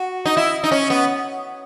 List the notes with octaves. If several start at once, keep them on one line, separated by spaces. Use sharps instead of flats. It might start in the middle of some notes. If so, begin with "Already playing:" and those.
Already playing: F#4
D#4
E4
D#4
C#4
B3